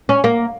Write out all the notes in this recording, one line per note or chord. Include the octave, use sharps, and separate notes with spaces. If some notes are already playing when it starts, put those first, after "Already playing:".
C#4
A#3